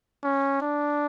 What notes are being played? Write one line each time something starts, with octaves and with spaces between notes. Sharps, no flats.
C#4
D4